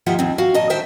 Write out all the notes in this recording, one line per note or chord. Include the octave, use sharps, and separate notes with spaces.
D#2 F3 F4 G4 E5 F#5
D#2 C4
F#4 F5
A#2 D#5 A5
G2 D#3 C5 E5 G5